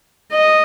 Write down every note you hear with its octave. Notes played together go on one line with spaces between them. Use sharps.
D#5